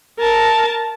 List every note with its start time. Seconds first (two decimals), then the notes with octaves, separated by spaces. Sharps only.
0.19 A#4 A5